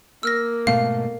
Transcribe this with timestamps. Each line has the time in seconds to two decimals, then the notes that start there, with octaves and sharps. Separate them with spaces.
0.23 A#3 E6 F6 A#6
0.67 G#2 B2 A3 F5